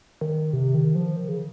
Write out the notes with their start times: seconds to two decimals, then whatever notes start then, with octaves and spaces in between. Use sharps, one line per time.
0.21 D#3
0.53 C3
0.74 D#3
0.95 F3
1.16 D#3
1.28 C#3